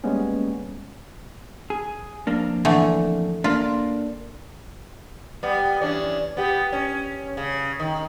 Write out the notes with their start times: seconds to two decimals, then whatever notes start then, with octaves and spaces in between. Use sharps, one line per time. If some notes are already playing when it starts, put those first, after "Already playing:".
0.04 G3 G#3 A#3 B3 C#4
1.70 G#4
2.27 F2 A#3 D4
2.65 D3 E3 A3
3.44 A#3 D4 F4
5.43 G3 B3
5.81 E3 C#4 D4
6.37 B3 G4
6.72 C#4
7.37 C#3
7.80 D#3